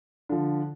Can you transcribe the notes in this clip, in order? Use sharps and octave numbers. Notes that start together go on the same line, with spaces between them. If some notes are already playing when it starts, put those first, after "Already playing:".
D3 F3